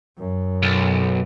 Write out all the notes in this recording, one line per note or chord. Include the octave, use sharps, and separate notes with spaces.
F#2
B1